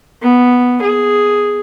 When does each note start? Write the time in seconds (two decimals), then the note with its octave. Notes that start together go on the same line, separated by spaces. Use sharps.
0.22 B3
0.81 G#4